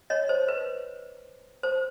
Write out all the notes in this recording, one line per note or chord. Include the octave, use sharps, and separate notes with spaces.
C#5 D#5
C5
B4
C5